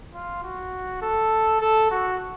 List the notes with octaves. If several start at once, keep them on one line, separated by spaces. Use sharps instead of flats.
F4
F#4
A4
A4
F#4